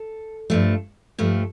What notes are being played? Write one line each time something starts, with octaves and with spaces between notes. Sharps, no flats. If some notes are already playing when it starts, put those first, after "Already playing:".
Already playing: A4
G2 F3 A3
G2 F3 A3